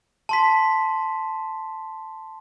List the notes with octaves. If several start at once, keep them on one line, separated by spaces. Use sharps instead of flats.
A5 C6 B6